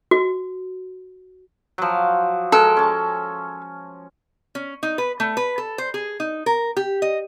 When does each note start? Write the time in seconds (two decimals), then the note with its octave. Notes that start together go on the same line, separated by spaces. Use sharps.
0.11 F#4
1.78 F3 F#3
2.52 G#3 A4 A#4
2.77 C#4 A5
4.55 C#4
4.83 D#4
4.98 B4
5.20 A3
5.37 B4
5.58 A4
5.78 C5
5.94 G#4
6.20 D#4
6.46 A#4
6.77 G4
7.02 D#5